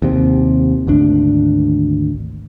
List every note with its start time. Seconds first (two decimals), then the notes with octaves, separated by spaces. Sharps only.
0.02 D#2 C3
0.87 G#1 D2 D4